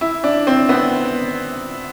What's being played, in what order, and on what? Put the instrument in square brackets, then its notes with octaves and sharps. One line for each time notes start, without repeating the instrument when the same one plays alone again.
[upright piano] E4
D4
C4
B3